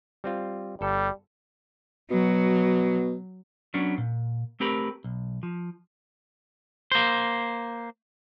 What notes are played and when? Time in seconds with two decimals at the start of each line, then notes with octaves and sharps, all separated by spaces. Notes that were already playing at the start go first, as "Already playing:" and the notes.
0.24 G3 C4 F4
0.81 G1 G3 A4
2.11 B2 F#3
3.74 F#3 B3 C#4 D4
3.98 A#2
4.60 A3 C4 G4 A#4 B4
5.04 B1
5.43 F3
6.92 A#3 C5